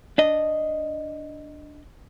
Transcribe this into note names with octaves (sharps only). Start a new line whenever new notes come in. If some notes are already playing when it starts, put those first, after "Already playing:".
D4 D#5